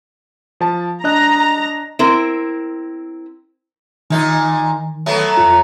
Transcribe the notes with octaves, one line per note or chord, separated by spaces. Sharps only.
F3 A5
D4 D#5 A#5 F#6
C4 E4 A#4
A#2 D#3 D#4
F#3 A3 B3
F2 F4